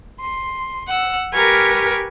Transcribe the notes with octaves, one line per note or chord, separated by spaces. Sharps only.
C6
F#5 E6
G4 A#4 B4 G#5 C#6 F6